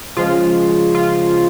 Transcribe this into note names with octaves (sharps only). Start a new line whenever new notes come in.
C#3 F3 G#3 F4
F4